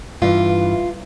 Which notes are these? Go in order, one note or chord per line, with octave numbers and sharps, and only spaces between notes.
G2 E3 F4